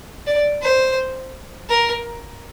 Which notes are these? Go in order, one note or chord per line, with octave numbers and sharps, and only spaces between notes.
D5
C5
A#4